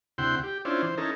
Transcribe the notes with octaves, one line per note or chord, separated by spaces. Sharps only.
D2 C3 E4 F#5 G5 C6
G4
C#4 D4 E4 F4 C5
E3 C5
C#4 D#4 E4 A4 A#4